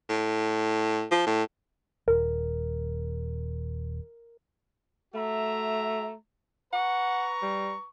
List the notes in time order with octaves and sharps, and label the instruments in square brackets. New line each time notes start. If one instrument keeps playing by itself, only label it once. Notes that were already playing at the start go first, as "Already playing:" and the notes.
[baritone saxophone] A2
F3
A2
[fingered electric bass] D#1 [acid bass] A#4
[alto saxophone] A3 [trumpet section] F#4 E5 A#5
[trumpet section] B4 A#5 C#6 [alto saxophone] F#5
[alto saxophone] G3